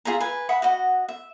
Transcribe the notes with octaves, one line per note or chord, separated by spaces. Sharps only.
F4 G#4 E5 A#5
B4 G#5
E5 F#5 B5 D#6
F#4 D#5 F#5
E5